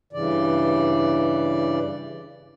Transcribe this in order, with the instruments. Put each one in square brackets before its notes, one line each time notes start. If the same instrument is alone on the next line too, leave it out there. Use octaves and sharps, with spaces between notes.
[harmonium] G2 C#3 E3 D5